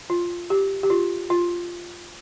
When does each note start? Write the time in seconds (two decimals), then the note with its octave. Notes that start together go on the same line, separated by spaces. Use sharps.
0.10 F4
0.50 G4
0.83 G4
0.90 F4
1.30 F4